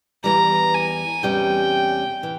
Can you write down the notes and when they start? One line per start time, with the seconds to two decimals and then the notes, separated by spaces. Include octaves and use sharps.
0.24 E2 E3 G3 A#5
0.74 G#5
1.23 E2 C3 G3 C#4 G5
2.23 E3